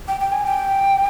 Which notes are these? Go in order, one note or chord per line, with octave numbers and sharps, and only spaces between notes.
G5
G5
G#5
G5